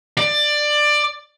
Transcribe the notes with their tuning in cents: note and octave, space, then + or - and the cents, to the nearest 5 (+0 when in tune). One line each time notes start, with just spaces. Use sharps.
D5 +15